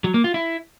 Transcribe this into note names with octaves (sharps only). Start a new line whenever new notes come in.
F#3
A#3
F4
E4